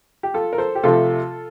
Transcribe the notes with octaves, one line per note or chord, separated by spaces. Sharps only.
G4
F4 A4
A#4
A4 C5
G4
C3 F3 A3 F4 A4